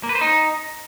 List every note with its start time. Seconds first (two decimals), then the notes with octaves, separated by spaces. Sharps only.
0.03 A#3
0.09 B4
0.15 C5
0.21 D#4